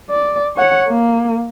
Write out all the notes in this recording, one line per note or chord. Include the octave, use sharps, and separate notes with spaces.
D5
C#5 F#5
A#3